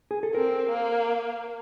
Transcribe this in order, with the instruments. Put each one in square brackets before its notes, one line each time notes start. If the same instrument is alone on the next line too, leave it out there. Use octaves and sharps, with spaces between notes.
[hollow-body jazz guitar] G#4
A4
[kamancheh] C4 [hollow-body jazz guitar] A#4
[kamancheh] A#3